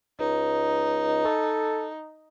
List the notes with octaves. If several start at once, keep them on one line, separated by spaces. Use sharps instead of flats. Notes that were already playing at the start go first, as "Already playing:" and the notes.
C#2 D#4
A4